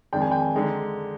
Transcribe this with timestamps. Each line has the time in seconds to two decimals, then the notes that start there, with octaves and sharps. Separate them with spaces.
0.13 F2 D#3 G#3 D4 G5
0.22 G#5
0.31 G5
0.55 D3 G#3 D#4